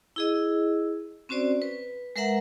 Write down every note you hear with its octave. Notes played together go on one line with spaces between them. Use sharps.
E4 G#4 D#5
C4 C#4 F#4 C5 D5
B4
G#3 A#4 B4 E5 F#5 A#5